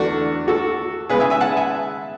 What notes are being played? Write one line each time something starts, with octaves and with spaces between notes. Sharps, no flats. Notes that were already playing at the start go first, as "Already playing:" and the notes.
Already playing: E2 D3 A3 D4 F#4
F#4 A4
C#3 G#3 B3 G#4 B4
E5 G#5
E5 G#5
F#5 A5
E5 G#5